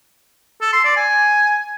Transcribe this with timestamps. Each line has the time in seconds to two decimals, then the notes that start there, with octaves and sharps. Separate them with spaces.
0.61 A4
0.73 C6
0.85 D5
0.97 G#5